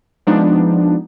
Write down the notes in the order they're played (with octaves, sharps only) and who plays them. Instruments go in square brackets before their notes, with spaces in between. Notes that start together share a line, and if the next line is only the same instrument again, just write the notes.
[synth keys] F3 G#3 B3 D4 D#4